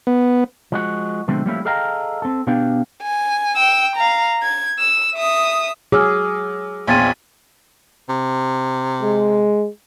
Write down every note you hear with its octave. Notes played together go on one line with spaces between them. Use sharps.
B3
F3 G#3 F#4
B2 D3 F3 G#3 A3 C4
F3 G3 A3 A#3 C#4 E4
G#4 A4 D#5 F5 G5 A#5
C4 A4
B2 B3 D4 G4 F5 G5
G#5
G5 E6
F5 A#5
G#6
E6
E5 D#6
F#3 G#4 D6 E6 F6
A#1 E2 C4 F4 C#5 G#5 A6 D#7
C3
G#3